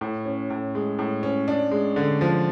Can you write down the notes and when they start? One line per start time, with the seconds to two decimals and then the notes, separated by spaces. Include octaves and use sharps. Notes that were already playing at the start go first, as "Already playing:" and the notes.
0.01 A2
0.25 C#4
0.50 A2
0.75 G#3
0.99 A2
1.23 C#4
1.48 D4
1.71 G#3
1.96 D3
2.21 F3